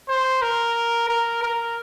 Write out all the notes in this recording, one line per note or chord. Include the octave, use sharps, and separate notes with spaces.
C5
A#4
A#4
A#4